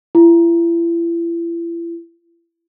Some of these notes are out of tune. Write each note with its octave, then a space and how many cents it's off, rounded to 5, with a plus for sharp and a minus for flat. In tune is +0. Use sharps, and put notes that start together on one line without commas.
E4 +40